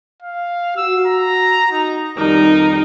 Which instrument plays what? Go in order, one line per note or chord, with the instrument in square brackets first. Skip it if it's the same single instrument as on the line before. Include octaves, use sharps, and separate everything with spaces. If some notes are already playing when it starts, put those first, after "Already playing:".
[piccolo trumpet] F5
[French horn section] F#4 [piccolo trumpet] E6
[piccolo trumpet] A#5
D#4
[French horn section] F2 D#3 G3 [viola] D#4 [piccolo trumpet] A#4